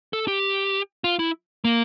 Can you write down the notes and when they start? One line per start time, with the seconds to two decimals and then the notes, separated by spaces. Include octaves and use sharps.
0.13 A4
0.28 G4
1.04 F4
1.19 E4
1.65 A#3